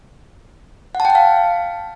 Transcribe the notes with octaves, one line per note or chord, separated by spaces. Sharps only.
F#5
A5
G5
A5
F5